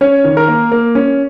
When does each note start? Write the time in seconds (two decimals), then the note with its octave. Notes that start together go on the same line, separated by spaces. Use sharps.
0.01 C#4 C#5
0.24 D#3
0.37 A#4
0.48 A#3
0.72 A#3
0.95 C#4